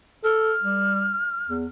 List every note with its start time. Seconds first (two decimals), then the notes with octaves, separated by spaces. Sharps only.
0.24 A4 F6
0.63 G3
1.47 E2